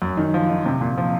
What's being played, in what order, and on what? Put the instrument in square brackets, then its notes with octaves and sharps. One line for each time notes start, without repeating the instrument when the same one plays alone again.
[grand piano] F#2
D#3
F3
D#3
C3
A#2
F3